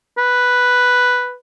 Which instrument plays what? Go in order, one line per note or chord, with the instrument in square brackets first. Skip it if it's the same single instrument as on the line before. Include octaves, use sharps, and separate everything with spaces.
[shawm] B4